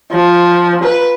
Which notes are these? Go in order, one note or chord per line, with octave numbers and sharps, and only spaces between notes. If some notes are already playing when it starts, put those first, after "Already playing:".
F3
B4